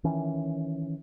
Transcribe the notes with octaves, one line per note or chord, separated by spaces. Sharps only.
D#3 E3 C#4